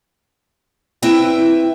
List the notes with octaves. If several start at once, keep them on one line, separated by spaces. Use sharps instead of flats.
C4 E4 B4 E5 G5